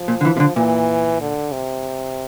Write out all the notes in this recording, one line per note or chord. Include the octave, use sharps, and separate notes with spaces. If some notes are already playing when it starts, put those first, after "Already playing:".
Already playing: F3
A#2
D3
E3
C3
D3
A#2 E3
D3
C3